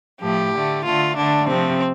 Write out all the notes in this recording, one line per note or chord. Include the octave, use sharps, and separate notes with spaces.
A2 F3 A3 G4
D3 A3
D3 A3 F4
D3 A3 D4
C3 F3 A3 C4